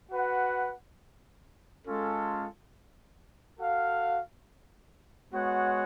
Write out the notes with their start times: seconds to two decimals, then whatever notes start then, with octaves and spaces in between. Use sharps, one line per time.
0.12 F#4 B4 F#5
1.86 G#3 C#4 F4 A4
3.59 F#4 A4 F5
5.33 G#3 B3 F#4 C#5 F#5